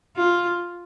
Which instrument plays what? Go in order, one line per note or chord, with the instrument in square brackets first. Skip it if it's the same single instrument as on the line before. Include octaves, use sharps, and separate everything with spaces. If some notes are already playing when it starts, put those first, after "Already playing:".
[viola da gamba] F4